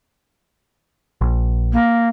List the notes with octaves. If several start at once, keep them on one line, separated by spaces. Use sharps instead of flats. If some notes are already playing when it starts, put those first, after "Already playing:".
A#1
A#3